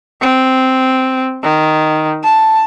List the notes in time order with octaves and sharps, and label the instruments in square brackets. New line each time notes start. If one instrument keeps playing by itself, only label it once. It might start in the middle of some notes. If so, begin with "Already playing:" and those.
[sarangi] C4
D#3
A5